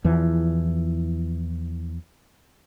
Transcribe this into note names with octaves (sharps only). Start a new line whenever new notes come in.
E2 E3 F3